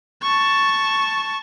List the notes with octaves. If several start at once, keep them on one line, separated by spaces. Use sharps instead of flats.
A5 C#6